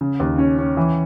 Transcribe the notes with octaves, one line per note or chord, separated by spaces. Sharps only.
C#3
D#2
C#4
C#4
E3